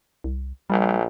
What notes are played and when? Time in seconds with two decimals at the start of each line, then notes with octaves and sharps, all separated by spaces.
0.24 C2
0.70 A#1 G3